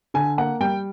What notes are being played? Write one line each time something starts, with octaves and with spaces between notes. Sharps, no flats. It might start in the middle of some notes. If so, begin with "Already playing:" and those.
D3 G#5
A#3 F#5
G3 G5